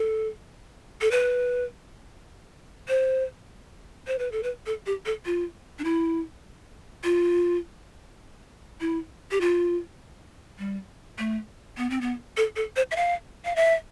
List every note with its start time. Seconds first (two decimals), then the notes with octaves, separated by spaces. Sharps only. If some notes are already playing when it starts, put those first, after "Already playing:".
Already playing: A4
1.01 A4
1.11 B4
2.88 C5
4.07 C5
4.19 B4
4.32 A4
4.43 B4
4.66 A4
4.86 G4
5.06 A4
5.26 F4
5.79 D4
5.84 E4
7.04 F4
8.81 E4
9.31 G4
9.41 F4
10.59 G3
11.18 A3
11.77 B3
11.90 C4
12.01 B3
12.37 A4
12.56 A4
12.76 C5
12.91 E5
12.96 F5
13.45 F5
13.56 E5